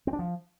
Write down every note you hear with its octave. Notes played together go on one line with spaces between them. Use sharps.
C4
D4
F3